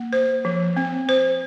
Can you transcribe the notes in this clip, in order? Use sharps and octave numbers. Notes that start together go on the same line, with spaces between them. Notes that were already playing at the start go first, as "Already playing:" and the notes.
Already playing: A#3
C5
F3
C4
C5